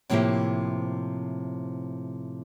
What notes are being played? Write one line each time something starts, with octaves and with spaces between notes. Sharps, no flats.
A2 C3 F3 A#3 E4 G4